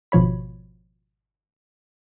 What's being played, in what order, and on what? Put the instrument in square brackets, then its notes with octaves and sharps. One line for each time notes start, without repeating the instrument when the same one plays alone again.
[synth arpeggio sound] G#1 B2 F3 C#5 B5